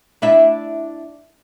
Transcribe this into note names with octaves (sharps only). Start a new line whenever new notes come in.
D4 E4 E5